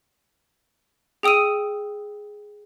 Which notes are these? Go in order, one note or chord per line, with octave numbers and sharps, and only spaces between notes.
G#4 G5 D#6 E6 D#7